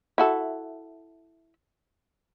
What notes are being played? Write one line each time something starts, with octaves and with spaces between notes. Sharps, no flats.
E4 F#4 A4